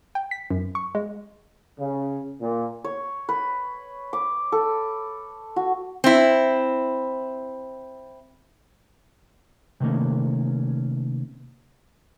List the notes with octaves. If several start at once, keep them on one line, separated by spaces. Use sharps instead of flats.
G5
B6
F#2
C#6
G#3
C#3
A#2
C#5
B4
D6
A4
F#4
C4 E4
C3 D#3 A3 A#3 C#4